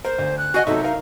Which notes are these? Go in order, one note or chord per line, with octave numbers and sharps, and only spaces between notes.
A#4 C5
D2
F#6
F#4 D#5 F#5 G#5
C3 F#3 D#4 A4 E5
A#4 F5